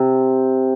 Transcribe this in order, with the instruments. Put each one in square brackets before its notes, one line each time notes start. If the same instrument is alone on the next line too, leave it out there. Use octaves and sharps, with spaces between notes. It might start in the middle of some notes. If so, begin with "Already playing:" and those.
Already playing: [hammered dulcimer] C3